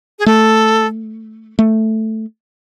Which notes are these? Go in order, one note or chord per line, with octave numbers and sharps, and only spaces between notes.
G#4
A3 A4
A3